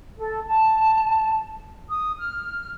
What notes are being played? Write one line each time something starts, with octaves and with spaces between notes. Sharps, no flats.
A4
A5
D#6
F6